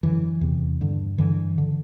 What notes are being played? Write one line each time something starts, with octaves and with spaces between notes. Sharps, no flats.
F#2 D3 E3
E2 C3
G2 D3
G2 D3 E3
D3